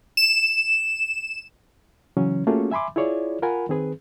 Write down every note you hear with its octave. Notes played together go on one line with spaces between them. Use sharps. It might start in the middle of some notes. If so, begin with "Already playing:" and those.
E7
C#3 E3 F#3 C#4
A3 A#3 C#4 F4 F#4 G#4
E5 G#5 B5 C6 D6
E4 F4 G#4 C#5 D5
F4 A#4 F#5 G#5 B5
D#3 C4 G#4 B4